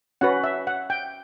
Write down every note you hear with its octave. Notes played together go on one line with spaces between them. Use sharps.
C#4 F#4 B4 F#5
E5
F#5
G5